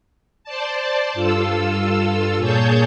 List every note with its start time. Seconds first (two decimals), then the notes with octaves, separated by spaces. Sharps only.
0.44 C5 D5 A5
1.14 G2 F4 A4 E6
2.38 A#2 G#4 C#5 A5 G6